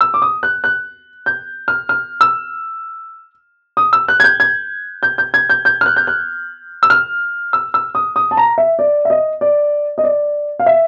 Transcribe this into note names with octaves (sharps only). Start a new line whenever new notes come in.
E6
D6
D#6
F#6
F#6
G6
F6
F6
E6
D#6
E6
F#6
G#6
G6
G#6
G6
G6
G#6
G6
G6
F6
F#6
G6
F#6
E6
F6
E6
E6
D#6
D#6
A5
A#5
E5
D5
E5
D#5
D5
D#5
D5
F5
E5